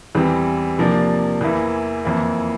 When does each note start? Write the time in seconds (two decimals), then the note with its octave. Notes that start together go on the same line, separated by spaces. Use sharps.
0.15 E2 E3 G3 C4
0.78 C3 F3 A#3 D4
1.41 E2 E3 A#3 E4
2.04 F2 E3 A#3 E4